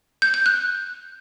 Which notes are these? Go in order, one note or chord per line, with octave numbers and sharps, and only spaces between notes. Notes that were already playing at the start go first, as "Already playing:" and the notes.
G6
G6
F#6